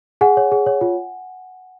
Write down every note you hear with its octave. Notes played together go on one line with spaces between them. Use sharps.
G#4 F#5 G#5
C#5
G#4
C#5
F4